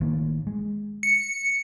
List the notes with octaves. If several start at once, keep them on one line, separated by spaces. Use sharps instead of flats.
A1 D#3 A#3
G#3
C#7